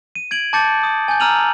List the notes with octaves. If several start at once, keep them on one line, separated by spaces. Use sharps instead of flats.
D#7
G#6 D7 F#7
A5 D6 G6 A6 C#7
D#6
G#5 G6
A#5 E6 F6 D#7 F7 F#7